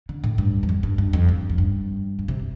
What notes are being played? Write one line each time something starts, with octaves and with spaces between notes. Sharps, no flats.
D3
A2
G2
F2
G2
G2
G2
F2
G2
F2
G2
G2
C3